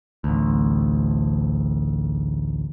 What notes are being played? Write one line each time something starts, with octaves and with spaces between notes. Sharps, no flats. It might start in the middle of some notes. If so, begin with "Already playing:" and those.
A1 D2